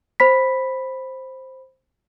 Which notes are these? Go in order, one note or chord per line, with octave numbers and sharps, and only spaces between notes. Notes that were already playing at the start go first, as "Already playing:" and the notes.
C5 B5 B6